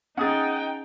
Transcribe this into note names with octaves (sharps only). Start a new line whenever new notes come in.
C#4 D#4 G#4 F#5 G5 D#6 A6